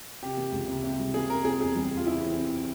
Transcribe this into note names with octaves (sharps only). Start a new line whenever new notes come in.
C3 G4
A#3
C#2
C3
C3
G3
A#3 G#4
C3 A#4
C4 G#4
E2 G#4
G3
E2
F4
E3 E4
C4
C4